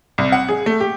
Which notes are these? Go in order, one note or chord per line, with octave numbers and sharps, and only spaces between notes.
C2
F#5
G#4
A3
G4